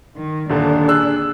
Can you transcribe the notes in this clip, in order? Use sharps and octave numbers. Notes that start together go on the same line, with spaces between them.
D#3
D#1 D3 D4 A4
G#4 E6 F#6